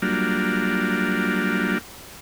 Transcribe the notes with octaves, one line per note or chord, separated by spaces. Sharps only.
F#3 G3 A#3 D4 F4